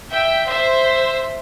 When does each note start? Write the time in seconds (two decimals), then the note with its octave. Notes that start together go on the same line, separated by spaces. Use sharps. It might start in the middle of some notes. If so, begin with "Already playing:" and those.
0.10 E5 G5
0.47 C5 E5